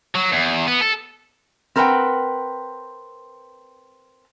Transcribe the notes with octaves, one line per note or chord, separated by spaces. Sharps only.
F#3
E2
B3
A4
C4 A#4 B4 E5 F#5 G5